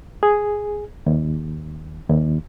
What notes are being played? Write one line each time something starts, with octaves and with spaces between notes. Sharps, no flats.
G#4
D#2
D#2